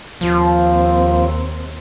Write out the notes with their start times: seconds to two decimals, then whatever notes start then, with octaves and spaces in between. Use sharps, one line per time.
0.21 D#2 F3 C4